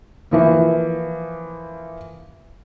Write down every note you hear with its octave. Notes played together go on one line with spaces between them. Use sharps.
E3 F3 A#3